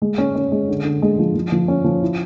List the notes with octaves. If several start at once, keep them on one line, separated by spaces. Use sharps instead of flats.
G#3
C#4
C#4
G#3
D3
D3
G#3
F3
F3
F3
C#4
F3
E4